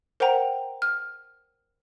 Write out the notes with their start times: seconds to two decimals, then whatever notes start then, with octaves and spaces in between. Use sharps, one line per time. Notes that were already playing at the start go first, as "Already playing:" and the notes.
0.20 A#4 C5 F#5 G5 A#5
0.82 F6